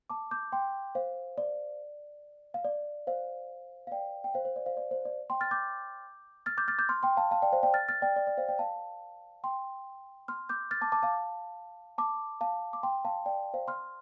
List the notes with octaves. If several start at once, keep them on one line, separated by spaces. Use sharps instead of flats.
A5 D6
D6 G6
G5 C6
C5 F5
D5
F5
D5
C5 F5
F5
D5 G5
G5
C5 F5
C5
D5
C5 F5
D5
C5
D5
G5 C6
F6 A6
D6 G6
F6 A6
D6 G6
F6 A6
D6 G6
C6 F6
G5 C6
F5 A5
F5 A5
D5 G5
C5 F5
D5 G5
F6 A6
F6 A6
D5 G5
D5
D5
C5 F5
D5 G5
F5 A5
G5 C6
C6 F6
D6 G6
F6 A6
A5 D6
A5 D6
F5 A5
A5 D6
F5 A5
D6
G5 C6
F5 A5
D5 G5
C5 F5
C6 F6